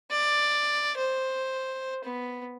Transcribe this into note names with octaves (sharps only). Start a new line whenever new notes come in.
D5
C5
B3